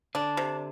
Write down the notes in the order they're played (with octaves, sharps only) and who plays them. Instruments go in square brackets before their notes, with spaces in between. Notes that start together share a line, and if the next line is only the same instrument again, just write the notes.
[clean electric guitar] D3 [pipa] D4
[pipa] C3